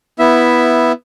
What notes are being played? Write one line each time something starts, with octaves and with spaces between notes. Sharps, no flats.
B3 E4 E5